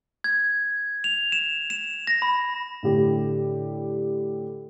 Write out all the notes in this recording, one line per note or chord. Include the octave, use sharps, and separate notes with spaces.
G#6
F7
E7
E7
A#6
B5
A2 D3 G4